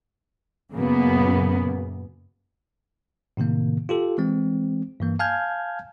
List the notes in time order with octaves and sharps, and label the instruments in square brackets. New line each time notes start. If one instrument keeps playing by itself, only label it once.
[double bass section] F#2 A#2 C#3 [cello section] A#3 B3
[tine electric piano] A2 C3 D#3 A#3
F4 G4 A4
E3 G#3 C4
G2 E3 A#3
F5 G#5 A5 F6 G6 G#6